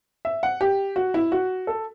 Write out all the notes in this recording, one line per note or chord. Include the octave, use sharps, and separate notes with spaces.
E5
F#5
G4
F#4
E4
F#4
A4